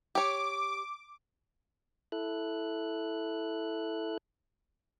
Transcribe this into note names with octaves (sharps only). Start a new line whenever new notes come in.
G4 C#5 D6
E4 A4 F#6